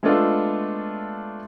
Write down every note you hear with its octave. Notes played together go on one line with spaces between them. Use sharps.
G#3 A3 B3 D4 F4 A4